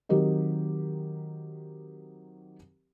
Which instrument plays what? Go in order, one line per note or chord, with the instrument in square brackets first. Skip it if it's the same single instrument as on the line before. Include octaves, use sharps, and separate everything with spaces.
[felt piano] D#3 F#3 C4 G4 A#4 D#5